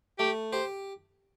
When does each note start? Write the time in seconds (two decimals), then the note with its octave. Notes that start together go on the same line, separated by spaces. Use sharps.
0.19 A3 G4
0.53 G4 C5